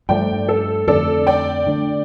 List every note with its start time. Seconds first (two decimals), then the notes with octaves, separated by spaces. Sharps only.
0.09 G2 F3 A3 D5 G5
0.48 A4
0.87 F2 D3 A3 D4 A4 D5
1.27 D5 G5
1.67 D3 A3 D4